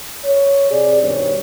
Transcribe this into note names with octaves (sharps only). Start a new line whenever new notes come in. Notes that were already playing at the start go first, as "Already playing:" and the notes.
C#5
C3 G#4 D5
G2 B2 D#3 C5 C#5